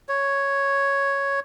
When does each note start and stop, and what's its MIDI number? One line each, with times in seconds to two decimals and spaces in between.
0.09 1.40 73